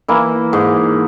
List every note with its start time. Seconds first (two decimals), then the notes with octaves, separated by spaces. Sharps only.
0.08 E3 A#3 E4
0.53 G#2